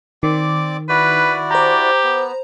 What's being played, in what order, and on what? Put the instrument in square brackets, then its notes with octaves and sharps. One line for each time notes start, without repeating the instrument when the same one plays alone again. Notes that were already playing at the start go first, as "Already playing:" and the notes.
[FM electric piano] D#3 [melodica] C4 D5 D6
[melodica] E4 F#4 D5 [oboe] B4
[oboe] G4 [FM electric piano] C5 A#5
[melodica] B3